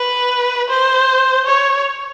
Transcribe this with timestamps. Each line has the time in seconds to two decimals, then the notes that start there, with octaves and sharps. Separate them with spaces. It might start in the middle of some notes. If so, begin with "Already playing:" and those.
Already playing: B4
0.70 C5
1.46 C#5